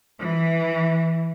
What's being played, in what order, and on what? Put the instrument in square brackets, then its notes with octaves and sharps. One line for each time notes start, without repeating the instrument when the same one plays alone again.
[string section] E3